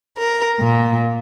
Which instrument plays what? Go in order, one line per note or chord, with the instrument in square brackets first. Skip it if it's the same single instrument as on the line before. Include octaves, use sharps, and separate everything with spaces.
[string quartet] A#4
A#2